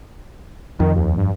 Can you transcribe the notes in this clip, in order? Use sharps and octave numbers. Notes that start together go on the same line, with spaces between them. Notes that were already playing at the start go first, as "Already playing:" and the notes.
F2 D#3
D#2
G2